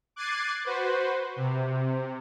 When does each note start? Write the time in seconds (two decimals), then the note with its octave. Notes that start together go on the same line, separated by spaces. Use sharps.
0.16 D6 F#6 G#6 A6 C7 D#7
0.64 F#4 B4 C5
1.36 C3